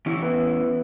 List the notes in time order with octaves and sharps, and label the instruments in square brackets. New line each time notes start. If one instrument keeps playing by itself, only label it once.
[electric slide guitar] E3 C#4 E4
[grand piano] B3 B4